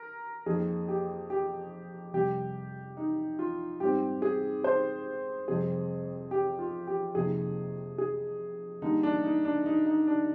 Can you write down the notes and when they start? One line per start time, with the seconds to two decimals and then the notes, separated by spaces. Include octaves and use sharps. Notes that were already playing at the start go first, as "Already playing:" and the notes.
Already playing: A#4
0.46 F2 D#3 A#3 G#4
0.88 G4
1.30 G4
2.13 F2 C3 G3 G4
2.97 D#4
3.39 F4
3.80 G#2 G3 C4 G4
4.22 G#4
4.64 C5
5.48 F2 C3 G3 C4 G#4
6.31 G4
6.59 F4
6.87 G4
7.15 F2 C3 D#3 A#3 G#4
7.98 G#4
8.82 D3 G3 A#3 D#4
9.03 D4
9.24 D#4
9.45 D4
9.66 D#4
9.87 D#4
10.07 D4